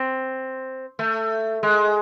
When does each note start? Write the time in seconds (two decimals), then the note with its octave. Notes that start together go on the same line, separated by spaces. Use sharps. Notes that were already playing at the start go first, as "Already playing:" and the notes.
Already playing: C4
0.99 A3
1.63 G#3